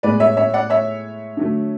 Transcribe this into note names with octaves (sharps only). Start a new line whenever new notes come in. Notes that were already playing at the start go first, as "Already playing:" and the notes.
A2 G#3 B3 B4 D5
C#5 E5
C#5 E5
D5 F#5
C#5 E5
D3 F#3 A3